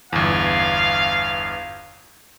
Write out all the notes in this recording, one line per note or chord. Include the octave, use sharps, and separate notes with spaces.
G1 E2 F5